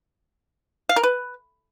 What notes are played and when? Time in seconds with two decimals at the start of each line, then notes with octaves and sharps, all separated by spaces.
0.89 F5
0.96 A#4
1.03 B4